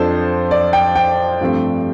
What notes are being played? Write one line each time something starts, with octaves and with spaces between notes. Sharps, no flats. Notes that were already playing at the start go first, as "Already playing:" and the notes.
Already playing: F2 F3 D4 A4 C5
D5
G5
G5
G2 F3 A3 C4